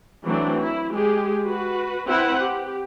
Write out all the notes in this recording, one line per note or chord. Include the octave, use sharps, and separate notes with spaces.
E3 F#3 A3 C4 D4
E4
G#3 G4 G#4
F#4 B4
C4 E4 B4 F#5
G4